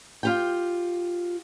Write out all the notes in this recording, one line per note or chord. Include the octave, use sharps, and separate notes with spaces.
F4 G4 G5